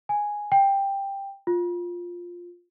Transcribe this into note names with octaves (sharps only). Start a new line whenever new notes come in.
G#5
G5
F4